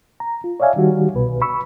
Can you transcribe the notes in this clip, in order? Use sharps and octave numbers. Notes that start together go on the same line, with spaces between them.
A#5
F4
C#5 D5 E5 F5 G#5
D#3 G3 F#4 G4
C2 B2 B4
B5 C#6 E6